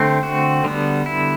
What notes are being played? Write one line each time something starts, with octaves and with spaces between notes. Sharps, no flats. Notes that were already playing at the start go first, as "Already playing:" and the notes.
Already playing: D3 A3 C4 G4
F#4
D3 G3 B3
E4